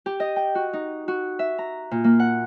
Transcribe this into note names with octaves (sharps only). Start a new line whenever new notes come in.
G4
D#5
G5
F#4
D#4
F#4
E5
A#5
A#2
A#3
F#5